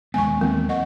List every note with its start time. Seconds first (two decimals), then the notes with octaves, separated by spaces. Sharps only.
0.14 D#2 G#3 B3 G#5 C#6
0.41 E3 F#3 A#3 C4
0.69 D#5 F#5 C#6